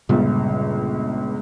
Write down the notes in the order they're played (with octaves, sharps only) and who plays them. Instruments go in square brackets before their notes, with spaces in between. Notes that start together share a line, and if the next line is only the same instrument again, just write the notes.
[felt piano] G1 C#2 [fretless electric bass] A#2 C#3 G3